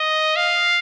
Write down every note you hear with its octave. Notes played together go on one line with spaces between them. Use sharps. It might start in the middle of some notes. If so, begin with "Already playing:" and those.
Already playing: D#5
F5